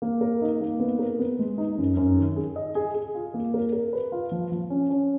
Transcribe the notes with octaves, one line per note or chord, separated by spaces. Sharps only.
A#3
A#4
D#4
A#3
B3
A#4
B3
G#3
D#4
F#2
F#2
D#3
G#4
D#5
G#4
G#4
F4
A#3
A#4
A#4
B4
F4
F3
F3
C#4
C#4